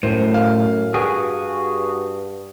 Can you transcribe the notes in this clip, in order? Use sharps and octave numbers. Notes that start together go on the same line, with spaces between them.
F#2 A2 C5
F5
G2 F#4 G#4